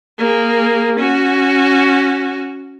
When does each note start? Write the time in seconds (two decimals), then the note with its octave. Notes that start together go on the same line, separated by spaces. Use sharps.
0.18 A#3 G#4
0.99 C#4 F#4